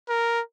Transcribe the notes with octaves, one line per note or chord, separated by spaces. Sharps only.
A#4